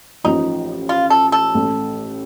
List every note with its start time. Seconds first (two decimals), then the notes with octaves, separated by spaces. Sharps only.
0.24 A1 A2 F3 D#4
0.89 F4
1.10 A4
1.32 A4
1.54 A1 A2 A3